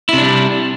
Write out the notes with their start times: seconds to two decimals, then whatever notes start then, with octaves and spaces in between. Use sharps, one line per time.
0.09 E4
0.13 C3
0.18 D4
0.22 G3